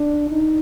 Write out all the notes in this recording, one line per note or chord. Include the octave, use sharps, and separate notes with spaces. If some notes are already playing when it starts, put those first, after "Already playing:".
Already playing: D4
D#4